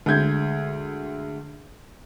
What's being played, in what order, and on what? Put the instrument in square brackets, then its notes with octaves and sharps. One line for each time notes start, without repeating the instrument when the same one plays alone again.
[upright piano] D2 G#3 G6 G#6